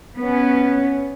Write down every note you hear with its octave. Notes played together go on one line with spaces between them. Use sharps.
B3 C#4